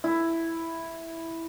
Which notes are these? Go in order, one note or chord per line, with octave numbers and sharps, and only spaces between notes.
E4